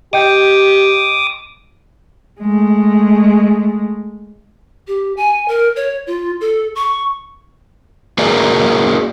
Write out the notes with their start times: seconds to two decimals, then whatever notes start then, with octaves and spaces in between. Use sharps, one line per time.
0.13 G4 D#5 G5 D6 D#6 G6
2.40 G#3 A3
4.87 G4
5.17 G#5
5.48 A#4
5.76 C#5
6.07 F4
6.41 A4
6.75 C#6
8.18 A#3 F#4 G#4 A#4 D5 E5